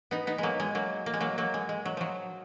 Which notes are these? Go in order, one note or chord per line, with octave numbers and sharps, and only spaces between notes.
B3 D#4
B3 D#4
F#3 G#3 A#3
G#3
F#3 A#3
A#3
G#3
F#3 A#3
F#3 A#3
G#3
G#3
F#3
F3 F#3